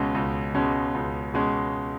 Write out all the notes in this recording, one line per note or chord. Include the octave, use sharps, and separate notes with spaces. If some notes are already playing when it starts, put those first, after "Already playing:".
Already playing: C#2 B2 G#3 C#4
C#2
B2 G#3 C#4
C#2
B2 G#3 C#4